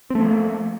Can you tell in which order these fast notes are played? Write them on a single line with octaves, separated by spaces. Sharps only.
C4 A3 F3 A#3